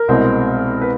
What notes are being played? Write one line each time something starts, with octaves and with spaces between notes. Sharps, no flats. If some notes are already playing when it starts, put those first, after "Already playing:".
Already playing: A#4
C2 B2 G#3 C4
B4